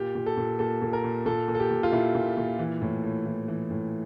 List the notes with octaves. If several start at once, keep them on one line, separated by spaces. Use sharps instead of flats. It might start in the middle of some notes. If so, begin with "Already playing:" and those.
Already playing: A#2 G4
A#2
A4
A#2
A#2 A4
A#2
A#4
A#2
A#2 A4
A#2
A4
G4
A#2
F4
A#2 E4
A#2
A#2
E3
A2
A2
E3
E3
A2